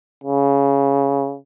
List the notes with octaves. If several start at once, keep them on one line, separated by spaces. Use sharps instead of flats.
C#3